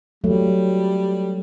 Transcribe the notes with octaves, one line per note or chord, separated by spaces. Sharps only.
F#3 G3 A3